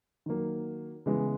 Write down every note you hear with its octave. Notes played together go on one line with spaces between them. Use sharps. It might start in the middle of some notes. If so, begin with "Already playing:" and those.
D#3 F#3 A#3
C#3 E3 G#3 B3